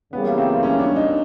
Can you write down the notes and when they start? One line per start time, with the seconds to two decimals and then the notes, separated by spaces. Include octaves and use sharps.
0.13 F#2 C#3 E3 G3 A#3 B3
0.38 C4
0.63 C#4
0.79 D4
0.96 D#4